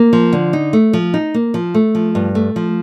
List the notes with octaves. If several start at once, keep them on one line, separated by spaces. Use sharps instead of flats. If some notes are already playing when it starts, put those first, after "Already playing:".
Already playing: A#3
F3
D3
D#4
A3
F3
D#4
A#3
F3
A3
F3
G2
A3
F3